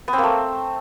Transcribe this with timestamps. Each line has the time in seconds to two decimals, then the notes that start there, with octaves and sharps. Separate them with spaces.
0.08 B3
0.13 C4
0.18 A#3
0.23 A3